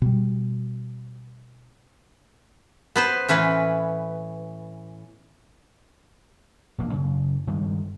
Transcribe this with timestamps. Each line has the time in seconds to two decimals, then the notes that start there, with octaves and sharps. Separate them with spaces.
0.02 B2 G3
2.96 B3 B4 C5
3.28 A2 E3 C#4 B4
6.78 E1 A#1 A#3
6.93 F#2 C#3
7.47 G2 D#3 G3 G#3